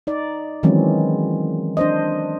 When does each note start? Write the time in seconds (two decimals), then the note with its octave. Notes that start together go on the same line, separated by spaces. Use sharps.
0.07 D#4 D5
0.63 D#3 E3 F#3 G#3 C4 C#4
1.77 D4 C5 D#5